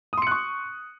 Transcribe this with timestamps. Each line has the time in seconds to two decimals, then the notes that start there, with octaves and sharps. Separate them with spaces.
0.13 D#6
0.17 C6
0.22 C#7
0.27 F#6
0.31 C#6